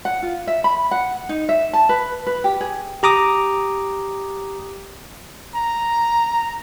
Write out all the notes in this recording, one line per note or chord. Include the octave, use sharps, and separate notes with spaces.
F#5
F4
E5
B5
F#5
D#4
E5
A5
B4
B4
G4
G#4
G4 A#5 D6 D#6
A#5